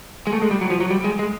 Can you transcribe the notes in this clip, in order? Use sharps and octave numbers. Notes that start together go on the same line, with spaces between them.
G#3
A3
G#3
G3
F#3
F3
F#3
G3
G#3
G#3